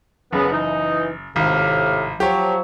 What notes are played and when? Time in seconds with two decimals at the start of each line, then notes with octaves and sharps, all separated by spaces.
0.33 F#1 C#3 B3
0.52 E3 D#4
1.36 G#1 A2 C3 F5
2.20 F3 F#3 G4 C#5